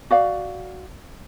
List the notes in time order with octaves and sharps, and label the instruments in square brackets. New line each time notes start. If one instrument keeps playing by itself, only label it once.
[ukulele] F#4 D5 F5